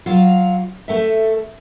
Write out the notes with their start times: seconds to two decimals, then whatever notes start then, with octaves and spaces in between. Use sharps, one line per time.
0.06 F#3 F4 F5
0.88 A3 A4 E5